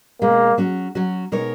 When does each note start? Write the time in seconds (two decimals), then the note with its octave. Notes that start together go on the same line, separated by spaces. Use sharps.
0.22 B2 G#3 A#3 C#4
0.58 F#3 C#4 F#4
0.95 F#3 C#4 F#4
1.32 B2 G#3 D#4 A#4 C#5